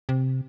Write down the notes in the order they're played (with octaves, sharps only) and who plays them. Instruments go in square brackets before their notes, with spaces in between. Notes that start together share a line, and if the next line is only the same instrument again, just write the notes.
[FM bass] C3